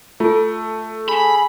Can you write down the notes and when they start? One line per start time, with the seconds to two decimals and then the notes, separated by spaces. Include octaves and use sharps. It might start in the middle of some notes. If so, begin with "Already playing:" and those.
0.20 A3 F4 A4
1.09 G#4 B5